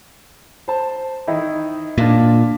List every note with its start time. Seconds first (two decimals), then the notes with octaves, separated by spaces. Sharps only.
0.68 C5 A5
1.27 D#3 D#4 E4
1.98 A#2 D4 F4